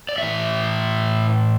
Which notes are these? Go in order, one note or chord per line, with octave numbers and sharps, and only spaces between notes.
D5
A2 E3 E5